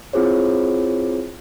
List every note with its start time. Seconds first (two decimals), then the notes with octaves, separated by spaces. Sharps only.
0.13 C4 E4 F4 G#4 C5 C#5